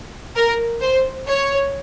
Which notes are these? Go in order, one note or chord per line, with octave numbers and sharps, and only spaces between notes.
A#4
C5
C#5